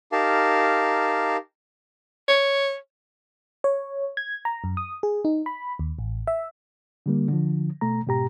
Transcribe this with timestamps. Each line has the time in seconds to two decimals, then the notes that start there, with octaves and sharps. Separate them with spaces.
0.12 D#4 G4 A#4 F5 A5
2.28 C#5
3.64 C#5
4.17 G#6
4.45 A#5
4.64 F#2
4.77 D#6
5.03 G#4
5.25 D#4
5.46 B5
5.79 D#2
5.99 A1
6.27 E5
7.06 D3 G3 A#3
7.29 D3 F3
7.81 B2 A3 A#5
8.07 G#2 B2 G4 A#5